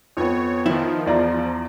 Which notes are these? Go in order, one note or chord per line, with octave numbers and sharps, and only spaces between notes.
F2 B3 C#5
D#3 F3 E4
E2 F3 D5 A#5